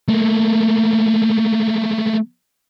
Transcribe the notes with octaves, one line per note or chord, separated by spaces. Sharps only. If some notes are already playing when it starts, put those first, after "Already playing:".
A3 A#3